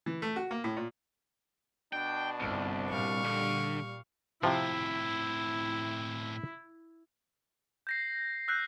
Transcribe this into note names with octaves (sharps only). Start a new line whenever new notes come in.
E3
A3
F#4
A#3
A2
A#2
B2 D4 G5
G1 C2
A#2 G3 F5 C#6
D3
A2 C3 F3 C4 E4
G6 A#6 C7
E6 F#6 G6 C7